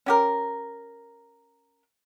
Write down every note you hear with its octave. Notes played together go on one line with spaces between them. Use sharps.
C#4 G4 A#4